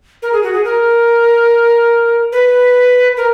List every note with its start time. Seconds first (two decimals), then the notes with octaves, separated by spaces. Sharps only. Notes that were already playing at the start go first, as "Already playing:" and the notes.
0.22 A#4
0.33 G#4
0.43 F#4
0.54 G#4
0.65 A#4
2.32 B4
3.17 A#4